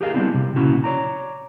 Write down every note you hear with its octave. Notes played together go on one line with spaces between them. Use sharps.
G4 G#4 A#4 D#5 F5
G3 G#3 B3 C4 D4 E4
C3
A#2 C#3 C#4 E4 F#4
C#5 D5 A#5